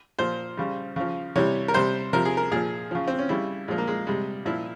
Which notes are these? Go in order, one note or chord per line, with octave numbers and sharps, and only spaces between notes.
A#2 F3 C5
C#3 G3
C#3 F3
C3 E3 G3 C#5
A#4
C3 G3 C5
C3 F3 A#4
G#4
A#4
A#2 F3 G#4
C#3 F3
C4
C#4
C#3 G3 E4
A#2 F3 G#3
A#3
G#3
C3 G3 G#3
A#2 F3 E4